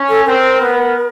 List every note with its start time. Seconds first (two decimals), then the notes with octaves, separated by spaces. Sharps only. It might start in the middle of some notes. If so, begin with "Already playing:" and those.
Already playing: C#4
0.09 A4
0.26 C4 A#4
0.60 B3